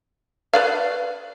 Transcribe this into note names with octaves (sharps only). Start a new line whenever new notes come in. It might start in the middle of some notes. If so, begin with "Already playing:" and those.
B4 D5 F5